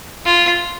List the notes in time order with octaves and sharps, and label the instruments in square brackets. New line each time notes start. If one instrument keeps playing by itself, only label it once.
[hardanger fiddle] F4